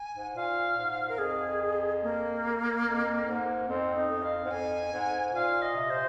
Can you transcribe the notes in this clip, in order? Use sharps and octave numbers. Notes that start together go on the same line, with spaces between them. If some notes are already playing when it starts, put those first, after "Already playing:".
Already playing: G#5
G#2
A#2 F5
G#2
A#4
F2 G#4
A#3
F2
G#2
F2 C4
D#4
F2
F5
G#2
F2 G#5
G#2
A#2 F5
D#5
C3
C5